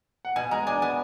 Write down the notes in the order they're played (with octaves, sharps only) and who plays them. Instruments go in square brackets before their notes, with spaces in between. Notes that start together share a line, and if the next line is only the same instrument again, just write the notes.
[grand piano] F#5
[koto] B2 [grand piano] G#5
[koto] G#3 [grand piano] A#5
[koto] D4 [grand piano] G#5
[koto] B3 [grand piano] G#5